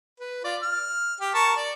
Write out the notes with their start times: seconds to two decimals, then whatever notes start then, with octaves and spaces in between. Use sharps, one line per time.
0.20 B4
0.44 F4 D5
0.62 F6
1.20 G4
1.34 A#4 A5 C#6
1.56 D5